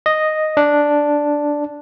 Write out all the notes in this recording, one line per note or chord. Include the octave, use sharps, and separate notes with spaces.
D#5
D4